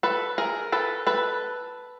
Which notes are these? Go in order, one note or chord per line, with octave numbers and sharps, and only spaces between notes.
A4 B4
G#4 A#4
A4 B4
A4 B4